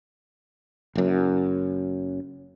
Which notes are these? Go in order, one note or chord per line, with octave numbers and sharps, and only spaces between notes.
F#1 F#2